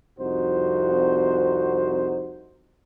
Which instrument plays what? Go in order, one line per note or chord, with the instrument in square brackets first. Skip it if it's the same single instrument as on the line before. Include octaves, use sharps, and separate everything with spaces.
[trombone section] C2 F2 D#4 F#4 C5